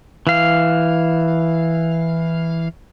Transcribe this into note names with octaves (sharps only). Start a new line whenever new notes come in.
E3 F5